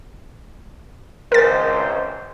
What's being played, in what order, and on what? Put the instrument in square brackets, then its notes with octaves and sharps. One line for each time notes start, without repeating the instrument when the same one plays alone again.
[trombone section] G#1 C#2 C5 [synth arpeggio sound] A#4 A6